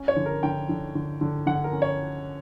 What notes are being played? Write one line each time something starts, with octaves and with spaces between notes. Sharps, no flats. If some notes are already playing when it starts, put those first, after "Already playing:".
Already playing: C#4
C#5
D3
A#4
D3 G5
D3
D3
D3
D3 F#5
A#4
C#4
C#5